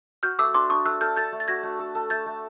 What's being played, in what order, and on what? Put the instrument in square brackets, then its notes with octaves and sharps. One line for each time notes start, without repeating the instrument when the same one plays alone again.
[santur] F#4 [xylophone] F6 G6
[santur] A3 [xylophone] D6 E6
[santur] D4 [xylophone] C6 D6
[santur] D4 [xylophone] C#6 D#6
[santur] A3 [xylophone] E6 F#6
[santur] A4 [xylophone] F6 G6
[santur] A4 [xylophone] G6 A6
[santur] A3
[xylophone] A6
[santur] F#4 [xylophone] G#6 A#6
[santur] A3
A4
A4
[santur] A3 [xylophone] G6 A6
[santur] A3